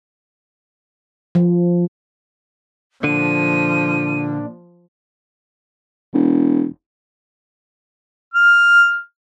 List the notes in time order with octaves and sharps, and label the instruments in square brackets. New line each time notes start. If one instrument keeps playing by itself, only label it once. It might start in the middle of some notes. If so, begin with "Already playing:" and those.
[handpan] F3
[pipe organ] A#2 D4 [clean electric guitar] D3 [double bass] F3 [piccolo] D#7
[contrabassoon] E1
[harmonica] F6